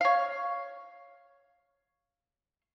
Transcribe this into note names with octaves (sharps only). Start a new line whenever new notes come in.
C#5 F5